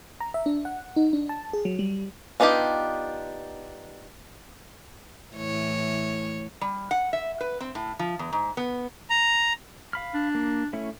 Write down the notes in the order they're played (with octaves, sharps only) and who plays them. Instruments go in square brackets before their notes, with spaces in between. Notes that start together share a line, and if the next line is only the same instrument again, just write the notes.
[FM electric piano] A#5
E5
D4
F#5
D#4
D4
A5
G#4
F#3
G3
[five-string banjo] B3 D4 D#4 F4 G4
[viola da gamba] A2 E3 C#5
[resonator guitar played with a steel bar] G3
F#5
E5
B4
C4
A2
F3
E2
G#2
B3
[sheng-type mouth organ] A#5
[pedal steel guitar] F5 B5 F6
[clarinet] D4
[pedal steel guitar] A#3
A3 C#4 E4